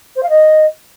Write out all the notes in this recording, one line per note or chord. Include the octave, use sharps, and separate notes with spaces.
C5
F5
D#5